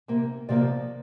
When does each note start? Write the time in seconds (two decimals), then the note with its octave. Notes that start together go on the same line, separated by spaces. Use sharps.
0.08 C3 A#3
0.49 C3 F3 A#3 D5